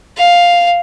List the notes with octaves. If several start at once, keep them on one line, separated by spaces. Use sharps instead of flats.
F5